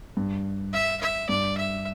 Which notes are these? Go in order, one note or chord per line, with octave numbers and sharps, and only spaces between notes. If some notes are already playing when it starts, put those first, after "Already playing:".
G2
E5
E5
G2 D5
E5